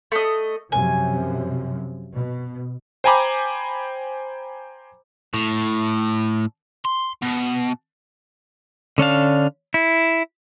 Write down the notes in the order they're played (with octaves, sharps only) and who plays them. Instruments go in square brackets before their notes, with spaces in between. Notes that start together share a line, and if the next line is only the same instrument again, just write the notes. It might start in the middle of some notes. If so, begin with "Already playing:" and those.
[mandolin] A3 D#5
[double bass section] F#2 C3 F3 [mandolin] G#5
[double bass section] B2
[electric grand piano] C5 G5 G#5 A#5 B5 D6
[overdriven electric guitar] A2
C6
B2
[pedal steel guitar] D3 C#4 D4 F5
E4